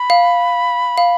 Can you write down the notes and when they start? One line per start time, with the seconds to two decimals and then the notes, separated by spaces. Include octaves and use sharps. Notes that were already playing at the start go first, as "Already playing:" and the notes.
Already playing: B5
0.10 F5
0.98 F5